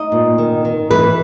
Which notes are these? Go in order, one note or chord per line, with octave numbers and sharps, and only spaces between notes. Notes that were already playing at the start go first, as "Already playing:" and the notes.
Already playing: D#4 D#5
A#2
D#3
D#3
E3 B4